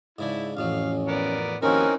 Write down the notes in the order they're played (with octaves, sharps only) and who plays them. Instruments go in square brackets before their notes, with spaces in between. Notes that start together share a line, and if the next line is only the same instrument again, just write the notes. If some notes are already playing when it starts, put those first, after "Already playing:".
[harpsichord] G#2 C#3 D4 [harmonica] E4
[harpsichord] A1 F2 F#3 [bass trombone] C#4 [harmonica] F5
[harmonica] B3 A#4 D5
[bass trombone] D#2 [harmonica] E3 C4 D#4 [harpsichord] F3 F#4 [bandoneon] C#4 A#4